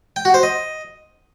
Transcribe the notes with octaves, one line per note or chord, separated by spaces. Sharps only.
G5
F#4
C5
D#5